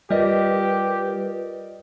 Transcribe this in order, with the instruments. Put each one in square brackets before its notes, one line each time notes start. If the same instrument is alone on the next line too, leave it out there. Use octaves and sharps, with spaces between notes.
[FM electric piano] G3 [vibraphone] F4 A#4 B4 [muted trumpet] G4 [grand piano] D5 D#5